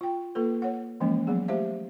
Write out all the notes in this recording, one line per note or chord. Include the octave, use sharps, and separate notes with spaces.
F4 G5
A#3 F4 A4 B4
C#5 F#5
E3 F3 G#3 A#3 C#4
F#3 B3 G#4
A3 G4 C5 E5 F5